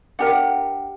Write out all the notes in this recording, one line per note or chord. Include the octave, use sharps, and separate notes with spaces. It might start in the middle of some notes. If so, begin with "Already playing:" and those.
D4 G4 A#4 F#5